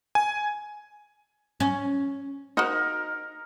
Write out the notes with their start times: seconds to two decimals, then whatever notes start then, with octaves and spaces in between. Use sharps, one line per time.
0.15 G#5
1.60 C#4
2.57 D#4 F#4 A#4 C5 D#5